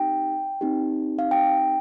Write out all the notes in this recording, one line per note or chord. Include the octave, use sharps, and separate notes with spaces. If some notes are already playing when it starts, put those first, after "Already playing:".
Already playing: C4 D#4 G4 G5
C4 D#4 G4
F5
G5